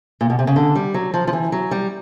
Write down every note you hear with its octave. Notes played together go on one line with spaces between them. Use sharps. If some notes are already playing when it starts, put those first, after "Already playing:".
A#2
B2
C3
C#3
D3
G3
F#3
F3
F3
E3
F#3
G3